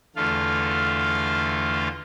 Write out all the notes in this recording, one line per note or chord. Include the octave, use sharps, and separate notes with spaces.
E2 D3 A3 F4 F5